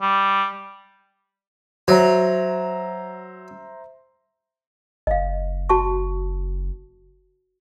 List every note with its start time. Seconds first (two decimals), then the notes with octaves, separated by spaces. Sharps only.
0.02 G3
1.88 F#3 C5 E5 A#5
5.07 F#1 D#5 F5
5.69 F#4 A5 C#6